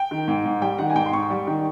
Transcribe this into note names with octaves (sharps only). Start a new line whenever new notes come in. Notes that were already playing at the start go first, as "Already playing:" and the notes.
Already playing: G5
D#3
G#2
G#2
G3 G5
D#3 F#5
G#5
G#2 G5
C6
G#2 C#6
G3
D#3